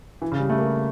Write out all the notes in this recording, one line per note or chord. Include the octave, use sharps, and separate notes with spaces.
E3
C#3
G3
A3
A#3